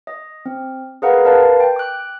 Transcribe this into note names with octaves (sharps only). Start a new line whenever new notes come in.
D#5
C4
G#4 A#4 B4 F5 F#5 A#5
A#4 B4 D5 F5 A5
G5
D6 F#6